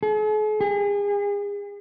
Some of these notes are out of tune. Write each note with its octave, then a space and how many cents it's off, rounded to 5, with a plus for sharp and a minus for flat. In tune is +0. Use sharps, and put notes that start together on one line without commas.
G#4 +45
G#4 -40